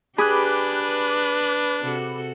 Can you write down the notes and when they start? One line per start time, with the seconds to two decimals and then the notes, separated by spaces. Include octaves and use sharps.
0.18 D4 G4 G#4 B4 B5 D6 F#6
0.83 B4
1.82 C3 F#4 A4